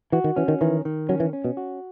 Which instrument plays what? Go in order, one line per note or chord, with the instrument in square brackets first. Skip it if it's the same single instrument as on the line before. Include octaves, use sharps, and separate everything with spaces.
[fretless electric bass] E3 [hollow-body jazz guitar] F#4
[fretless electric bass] D#3
[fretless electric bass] E3 [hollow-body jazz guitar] C#4
[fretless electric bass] D#3
[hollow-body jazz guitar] D#3 [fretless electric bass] E3
[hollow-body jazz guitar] D#3
[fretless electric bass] F#3 [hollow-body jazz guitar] C#4
[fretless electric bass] E3
[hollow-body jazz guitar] C#4
[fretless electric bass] B2
[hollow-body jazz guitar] F#4